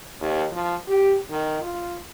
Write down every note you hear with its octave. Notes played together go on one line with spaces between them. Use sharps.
D#2
F3
G4
D#3
F4